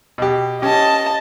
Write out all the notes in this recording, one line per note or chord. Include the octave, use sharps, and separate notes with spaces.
B2 G4
C#4 G4 D#5 A5